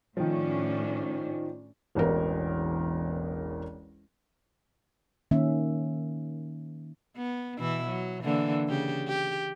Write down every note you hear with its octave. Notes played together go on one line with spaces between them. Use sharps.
A2 D#3 F3 C#4 D4
E1 A1 E2 A#4
D#3 A#3 C#4 E5
B3
B2 E3 E4
F#3
D3 E3 A#3
C#3 G4
G4